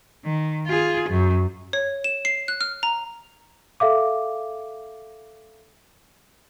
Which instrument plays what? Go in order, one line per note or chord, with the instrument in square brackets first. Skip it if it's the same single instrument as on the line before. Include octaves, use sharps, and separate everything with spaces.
[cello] D#3
F4 G#4
F#2
[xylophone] C#5
E7
C7
F#6
F6
A#5
[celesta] A4 E5 F5 D6